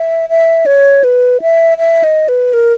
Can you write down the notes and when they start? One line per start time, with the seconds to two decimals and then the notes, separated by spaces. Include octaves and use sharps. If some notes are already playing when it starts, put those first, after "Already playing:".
Already playing: E5
0.29 E5
0.66 C#5
1.04 B4
1.42 E5
1.78 E5
2.04 D#5
2.28 B4
2.53 A#4